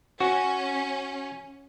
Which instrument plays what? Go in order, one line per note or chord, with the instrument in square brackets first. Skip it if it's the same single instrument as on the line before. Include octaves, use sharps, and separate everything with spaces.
[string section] C#4 [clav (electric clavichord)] F#4